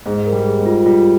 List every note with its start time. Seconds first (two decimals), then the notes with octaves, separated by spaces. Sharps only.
0.06 G#2 G#4
0.26 A#4
0.32 G3
0.46 G#4
0.59 G#2
0.66 F4
0.86 G3 F4